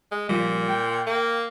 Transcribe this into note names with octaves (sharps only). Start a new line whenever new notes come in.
G#3
A#2 F3 G3
G5
A#3